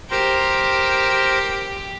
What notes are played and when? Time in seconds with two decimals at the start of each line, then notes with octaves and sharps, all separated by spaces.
0.10 G4 A#4 C5